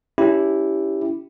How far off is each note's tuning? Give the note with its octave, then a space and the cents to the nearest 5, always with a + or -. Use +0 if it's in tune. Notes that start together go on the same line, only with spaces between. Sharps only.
C#4 +30 E4 +0 G4 +0